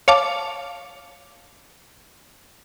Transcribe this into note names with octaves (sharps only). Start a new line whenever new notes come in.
C#5 F5 A5 D6